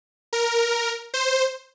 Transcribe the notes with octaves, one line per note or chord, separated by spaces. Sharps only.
A#4
C5